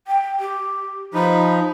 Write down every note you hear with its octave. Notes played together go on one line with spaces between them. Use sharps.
G5
G4
F3 D#4 B5